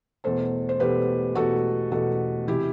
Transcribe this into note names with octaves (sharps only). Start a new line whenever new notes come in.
E2 B2 A3 A4 C5
C5
E2 B2 A3 G4 B4
E2 B2 A3 F#4 A4
E2 B2 A3 F#4 A4
C3 E3 E4 G4